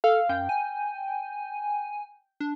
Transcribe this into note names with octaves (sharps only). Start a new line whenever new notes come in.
A4 F5
F#2 G5
G#5
D4